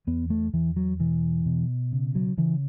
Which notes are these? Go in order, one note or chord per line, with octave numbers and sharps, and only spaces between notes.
E2 B3
A3
E2 E3
F#3
B2 E3
B2
C#3
F#3
C#3 E3